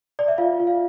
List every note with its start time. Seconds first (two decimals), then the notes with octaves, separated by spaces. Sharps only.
0.19 D5
0.28 E5
0.38 F4 F5
0.60 F4
0.67 F5